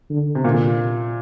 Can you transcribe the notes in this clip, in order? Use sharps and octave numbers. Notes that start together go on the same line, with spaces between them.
D3
C3
A#2 D3